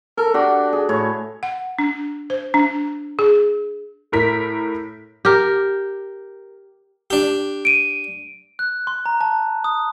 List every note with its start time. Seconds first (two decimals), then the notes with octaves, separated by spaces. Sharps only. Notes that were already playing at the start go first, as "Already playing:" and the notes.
0.18 A4 A#4
0.34 D4 F#4 G4
0.73 G#4
0.89 A2 C#5
1.43 F#5
1.79 D4
2.30 C5
2.54 D4
3.19 G#4
4.12 A2 A#4 B6
5.25 G4 A#4
7.10 D4 G4
7.65 D7 D#7
8.59 F#6
8.87 C6
9.06 A#5
9.21 A5
9.64 D#6